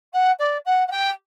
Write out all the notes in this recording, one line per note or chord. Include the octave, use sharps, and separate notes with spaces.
F#5
D5
F#5
F#5
G5